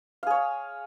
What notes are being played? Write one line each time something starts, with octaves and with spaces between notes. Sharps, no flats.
G#4 C#5 F5